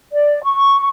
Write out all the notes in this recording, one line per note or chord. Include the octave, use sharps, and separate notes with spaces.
D5
C#6